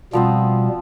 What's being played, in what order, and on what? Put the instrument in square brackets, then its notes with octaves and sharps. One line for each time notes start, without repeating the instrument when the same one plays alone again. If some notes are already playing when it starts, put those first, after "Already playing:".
[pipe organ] B2 G3 [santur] F3 B3 C4